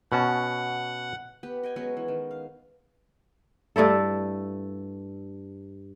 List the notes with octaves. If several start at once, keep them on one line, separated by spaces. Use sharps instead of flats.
B2 C#4 F#5 A5
B3 G4 B4
D#5 G5 G#5
F#3 G#3 B3 C#4
E3
D#3
F5
G2 A3 E4 A4